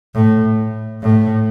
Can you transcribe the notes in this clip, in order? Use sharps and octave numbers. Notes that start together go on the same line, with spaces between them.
A2
A2